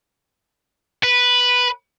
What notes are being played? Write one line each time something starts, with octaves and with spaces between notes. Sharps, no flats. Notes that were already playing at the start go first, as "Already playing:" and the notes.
B4